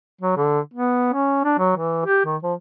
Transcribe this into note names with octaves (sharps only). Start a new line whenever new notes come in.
F#3
D3
B3
C#4
D4
F#3
E3
G4
D#3
F3